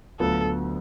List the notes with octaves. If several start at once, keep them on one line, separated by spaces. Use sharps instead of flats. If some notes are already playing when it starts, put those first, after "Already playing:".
D2 D3 F#3 B3 F4 A4